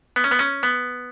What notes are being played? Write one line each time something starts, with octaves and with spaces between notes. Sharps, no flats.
B3
C#4
B3
C#4
B3